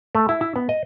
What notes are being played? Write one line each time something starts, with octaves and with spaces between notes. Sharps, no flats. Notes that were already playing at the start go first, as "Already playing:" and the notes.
A3
E4
E4
B3
D#5